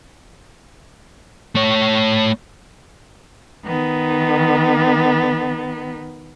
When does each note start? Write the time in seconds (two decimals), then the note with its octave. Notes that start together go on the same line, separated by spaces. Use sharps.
1.55 A3 C#5
3.65 D#3 B3